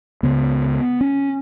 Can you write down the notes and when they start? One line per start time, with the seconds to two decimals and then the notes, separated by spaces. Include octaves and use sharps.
0.23 C#2 C#3 B3
1.01 C#4